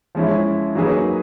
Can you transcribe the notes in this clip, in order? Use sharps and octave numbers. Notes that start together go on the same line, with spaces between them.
F3 G#3 C#4 E4
F#3 A#3 D#4 G#4 B4